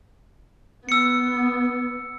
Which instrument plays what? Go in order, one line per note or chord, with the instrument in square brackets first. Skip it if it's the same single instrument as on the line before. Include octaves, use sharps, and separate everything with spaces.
[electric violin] B3 [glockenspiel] E6 C#7